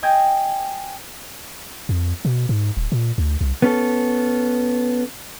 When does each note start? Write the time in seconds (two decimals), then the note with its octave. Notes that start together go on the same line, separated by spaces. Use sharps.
0.03 D#5 G5 G#5 D#6 G6 G#6
1.89 F2
2.25 B2
2.49 G#2
2.77 D1
2.92 A#2
3.18 D2
3.41 C2
3.62 B3 C#4 A4